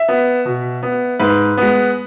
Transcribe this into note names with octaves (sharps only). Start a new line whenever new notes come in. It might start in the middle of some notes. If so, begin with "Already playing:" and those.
Already playing: E5
B3
B2
B3
G#2 B4
G#3 B3